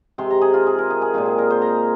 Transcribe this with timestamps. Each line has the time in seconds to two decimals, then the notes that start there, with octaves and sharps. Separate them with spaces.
0.18 C3 G#3 C4 C6
0.31 A#5
0.41 G#4
0.54 F4
0.67 G#4
0.79 A#4
0.90 G#4
1.02 G#4
1.14 A#2 G#3 C4 F4
1.26 G#4
1.38 A#4
1.50 C5
1.62 A#5